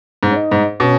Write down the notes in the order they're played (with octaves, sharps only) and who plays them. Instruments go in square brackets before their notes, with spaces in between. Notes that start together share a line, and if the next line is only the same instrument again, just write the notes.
[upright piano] G#2
[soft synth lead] C#4
D#4
[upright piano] G#2
[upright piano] B2 [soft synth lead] C#4